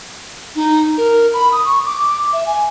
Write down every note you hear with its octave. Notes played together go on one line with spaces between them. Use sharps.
D#4
A#4
B5
D#6
C#6
D6
E5
G#5